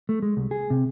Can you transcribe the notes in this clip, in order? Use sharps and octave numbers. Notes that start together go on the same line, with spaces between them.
A3
G#3
C2
G#4
C3